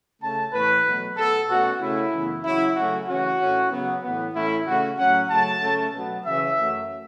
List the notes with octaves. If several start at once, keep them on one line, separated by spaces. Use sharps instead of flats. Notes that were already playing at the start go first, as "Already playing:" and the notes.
C#3 A3 C#4 A5
A2 E3 A3 B4
B2 F#3 A3
B2 B3 A4
B2 A3 C#4 F#4
C#3 A3 C#4 E4
F#2 C#3 E3 B3
C#3 F#3 C#4 E4
C#3 F#3 A3 C#4 F#4
C#3 E3 C#4 F#4
A2 A3 C#4
C#3 F#3 B3
A2 E3 B3
A2 E3 A3 C#4 E4
C#3 A3 C#4 F#4
A2 F#3 A3 C#4 F#5
C#3 F#3 A3 A5
C#3 A3 C#4
B2 F#3 B3
C#3 E3 C#4 E5
F#2 F#3 A3